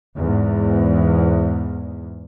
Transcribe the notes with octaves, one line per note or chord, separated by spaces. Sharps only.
E2 G#2